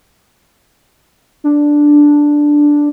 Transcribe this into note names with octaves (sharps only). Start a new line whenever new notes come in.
D4